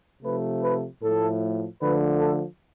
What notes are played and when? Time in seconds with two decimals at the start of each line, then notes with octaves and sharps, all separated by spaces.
0.23 C3 F3 A3 B4
0.62 B4
1.01 A2 F3 A3 A4
1.80 D3 F3 A3 B4
2.19 A4